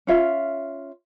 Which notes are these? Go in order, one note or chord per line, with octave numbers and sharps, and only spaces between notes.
C#4 F4 E5